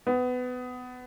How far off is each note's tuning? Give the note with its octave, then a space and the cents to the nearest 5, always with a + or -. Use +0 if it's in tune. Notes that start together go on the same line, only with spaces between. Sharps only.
B3 +20